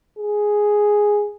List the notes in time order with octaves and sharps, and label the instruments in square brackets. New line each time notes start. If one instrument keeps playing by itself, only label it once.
[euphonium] G#4